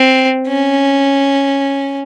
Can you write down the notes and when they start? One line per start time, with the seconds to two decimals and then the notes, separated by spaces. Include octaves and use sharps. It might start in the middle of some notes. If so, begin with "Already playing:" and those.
Already playing: C4
0.48 C#4